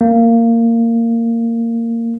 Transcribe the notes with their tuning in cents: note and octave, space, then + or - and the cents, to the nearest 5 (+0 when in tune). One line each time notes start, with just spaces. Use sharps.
A#3 -15